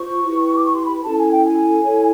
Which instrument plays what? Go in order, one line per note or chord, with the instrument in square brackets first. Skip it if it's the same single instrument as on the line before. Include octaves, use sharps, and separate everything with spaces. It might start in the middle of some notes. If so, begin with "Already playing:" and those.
Already playing: [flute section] F4 C5 C#6
E4 G4 B4
D6
C#6
C6
B5
C#4 E4 A4 A5
G#5
G5
G#5
E4 A4 C#5